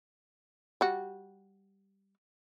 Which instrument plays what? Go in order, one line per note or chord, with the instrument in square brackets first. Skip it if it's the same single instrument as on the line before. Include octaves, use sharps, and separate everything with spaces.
[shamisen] G3 F#4